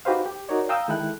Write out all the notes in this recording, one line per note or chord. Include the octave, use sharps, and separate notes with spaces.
D#4 F#4 G4 B4 C5 F5
G4
D#4 F#4 A#4 C#5 D5
F5 G5 A#5 D#6 E6 G6
D#3 G#3 E4 A4 G5 F#6